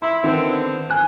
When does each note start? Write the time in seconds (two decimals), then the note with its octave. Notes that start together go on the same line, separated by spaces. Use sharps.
0.02 E4 C6
0.24 D3 D#3 B3 C4
0.90 G#5 F#6